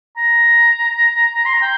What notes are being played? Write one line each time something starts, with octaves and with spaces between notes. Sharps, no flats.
A#5
C6
A#5
G5